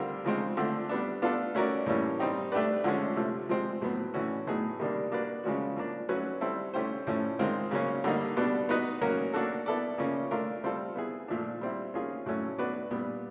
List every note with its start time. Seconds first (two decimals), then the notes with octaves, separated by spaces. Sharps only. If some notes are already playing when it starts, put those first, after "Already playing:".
Already playing: D3 G3 C4 F4 A#4
0.24 C#3 F3 G#3 C4
0.57 D3 F3 A3 C4
0.89 G3 B3 D4
1.22 B3 D4 F4 A4
1.55 A3 C#4 F#4 A#4 D5
1.86 A2 E3 G3 A#3 C#4
2.19 G3 C4 D#4 G4
2.52 A3 D4 G4 B4 D5
2.84 D3 F3 G#3 C#4
3.16 C3 F3 A3
3.49 F3 G#3 C4
3.82 A2 F#3 B3
4.14 A2 E3 A3 C#4 F#4
4.47 A2 F#3 B3 D#4 G#4
4.79 C3 D#3 G3 A#3 D4
5.12 A#3 D4 F#4 B4 D5
5.44 C#3 F3 G#3 C#4 F#4
5.77 F3 A#3 D4
6.09 F#3 A3 C#4 F#4 B4
6.41 G3 C4 E4 A4
6.74 A3 C#4 E4 G4 C5
7.07 A2 F3 A3 C#4
7.39 D#3 G#3 C4 F4
7.71 C#3 F#3 A#3 C#4
8.04 D3 G3 A#3 D#4
8.37 B2 G3 B3 D4
8.69 B3 D#4 F#4 B4
9.01 F#3 A#3 C#4 F#4 A#4
9.33 A#3 D4 F#4 A4
9.66 B3 E4 A4 D5
9.98 C#3 F3 A#3 C#4
10.31 A3 D4 F4 A#4
10.64 G3 C4 F4 A4
10.96 B3 E4 G#4
11.28 A#2 F3 A3 D4
11.61 G3 C4 E4
11.94 A#3 C#4 F4 G#4
12.26 A2 F#3 A3 C#4
12.58 B3 D4 F#4 B4 D5
12.91 A#2 G3 B3